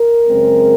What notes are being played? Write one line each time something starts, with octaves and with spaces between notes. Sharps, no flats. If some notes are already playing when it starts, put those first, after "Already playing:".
Already playing: A#4
F#2 C#3 G#3 C4